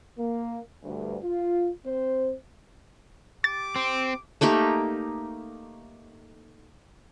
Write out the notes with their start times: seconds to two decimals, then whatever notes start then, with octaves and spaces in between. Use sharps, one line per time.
0.19 A#3
0.83 D2 G2
1.23 F4
1.85 C4 C5
3.44 G4 D6 A6
3.76 C4
4.41 A3 A#3 D#4 G4